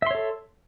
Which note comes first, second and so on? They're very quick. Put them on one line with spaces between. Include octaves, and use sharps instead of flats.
E5 C6 C#5 A4